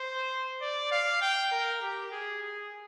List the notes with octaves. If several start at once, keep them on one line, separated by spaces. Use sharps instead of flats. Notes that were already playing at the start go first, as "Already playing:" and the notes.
Already playing: C5
D5
F5
G5
A#4
G4
G#4
G#4